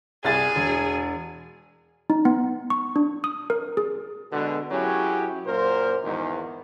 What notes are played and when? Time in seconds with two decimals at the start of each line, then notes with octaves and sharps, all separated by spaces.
0.24 C2 G#4 A6
0.56 E1
2.10 D#4
2.25 B3
2.70 C#6
2.96 D4
3.24 D#6
3.50 A#4
3.77 G#4
4.32 B2 D3 G#3
4.71 F#2 F#3 C#4 E4 G4 G#4
5.46 F#2 A#2 A#3 A#4 C5
6.04 E2 G#2 D#3